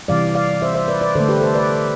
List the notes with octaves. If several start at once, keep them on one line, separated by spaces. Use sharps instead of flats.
C3 E3 G3 D5 F5
D5 F5
C5 E5
C5 E5
B4 D5
B4 D5
D3 A3 A4 C5
G4 B4
A4 C5
B4 D5